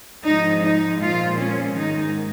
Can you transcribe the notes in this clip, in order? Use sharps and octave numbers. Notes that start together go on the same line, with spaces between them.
G#2 F3 G#3 D#4
D#4
A#2 F3 G#3 F4
C#4
G#2 D#3 G#3 D#4